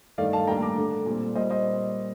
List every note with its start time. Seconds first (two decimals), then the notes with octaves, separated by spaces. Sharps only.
0.18 G2 D#3 A3 D5 F5
0.33 F5 A5
0.47 A2 G3 A#3 D4 G5 A#5
0.62 A#5 D6
0.77 D3 A3 D4
1.06 A#2 G3 C4
1.35 A#2 G3 A#3 C5 D#5
1.50 C5 D#5